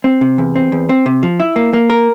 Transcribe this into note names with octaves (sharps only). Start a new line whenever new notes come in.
C4
C3
E2
C4
E2
C4
C3
F3
E4
A#3
A#3
A#4